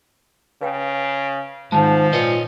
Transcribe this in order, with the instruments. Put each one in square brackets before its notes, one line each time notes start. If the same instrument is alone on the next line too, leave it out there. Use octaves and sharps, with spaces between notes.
[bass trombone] C#3 [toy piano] B4 F5 G5
[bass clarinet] G#2 [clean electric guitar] D#3 G#3 [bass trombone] F3 [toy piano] A5
[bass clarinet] A#2 [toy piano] B4 [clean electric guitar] C#5 D#5